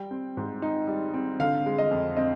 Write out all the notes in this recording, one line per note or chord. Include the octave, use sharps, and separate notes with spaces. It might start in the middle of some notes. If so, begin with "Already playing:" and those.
Already playing: G3 G5
C4
G#2
D#4
G3
C4
D3 F5
G#3
D#5
F2
C4 D#5